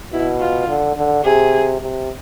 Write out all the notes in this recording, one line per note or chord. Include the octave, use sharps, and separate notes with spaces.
B2 E4
F4
D3
D3
C3 G#4
C3